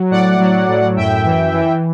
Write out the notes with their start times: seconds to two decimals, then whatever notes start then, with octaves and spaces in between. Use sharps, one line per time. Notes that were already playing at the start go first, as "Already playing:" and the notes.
Already playing: F#3
0.11 A2 D5 F#5
0.39 F#3
0.68 A2
0.96 F#2 E5 G5
1.25 E3
1.53 E3